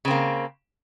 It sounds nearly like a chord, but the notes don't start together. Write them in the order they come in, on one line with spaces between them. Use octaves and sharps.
C#3 C4 A#3